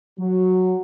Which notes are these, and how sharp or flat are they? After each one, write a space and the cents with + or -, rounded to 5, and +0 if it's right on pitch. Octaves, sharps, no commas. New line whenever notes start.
F#3 -5